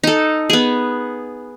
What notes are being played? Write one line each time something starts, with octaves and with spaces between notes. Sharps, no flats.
D#4 A4
B3 G#4